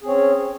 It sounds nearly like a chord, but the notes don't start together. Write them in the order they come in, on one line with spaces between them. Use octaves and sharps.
G#4 C4 C#5 C#4